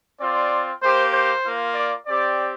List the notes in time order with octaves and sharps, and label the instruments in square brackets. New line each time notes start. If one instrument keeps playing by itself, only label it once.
[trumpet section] C4 F4 D5
A#3 G4 C5
C5
A#3 F4
D5
C4 G4 D5